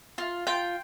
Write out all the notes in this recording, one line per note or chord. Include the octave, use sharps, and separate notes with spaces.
F4
F4 G5